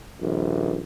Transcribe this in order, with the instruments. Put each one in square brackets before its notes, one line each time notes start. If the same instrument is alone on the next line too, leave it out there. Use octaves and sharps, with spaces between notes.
[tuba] D#1 [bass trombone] A#1